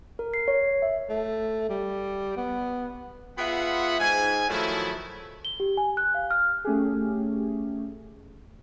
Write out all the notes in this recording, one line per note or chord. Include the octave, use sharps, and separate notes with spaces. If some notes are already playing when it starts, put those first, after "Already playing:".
A#4
C7
C#5
E5
A3
G3
B3
B3 F4 G#4 E5 F#5 B5
G#2 G#5
D#3 F3 F#3 A3 E4
G7
G4
G#5
F#6
F5
F6
A3 C#4 G4 G#4